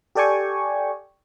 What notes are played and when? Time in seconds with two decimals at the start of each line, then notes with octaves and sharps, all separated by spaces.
0.15 G4 A4 D5 G5 G#5 C#6